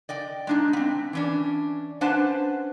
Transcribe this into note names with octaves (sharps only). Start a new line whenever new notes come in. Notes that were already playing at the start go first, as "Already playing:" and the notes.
D5 D#5 G5
G#3 D4 D#4
B3 C4
E3 C#4 D4
C#4 D4 B4 C5 F#5 A5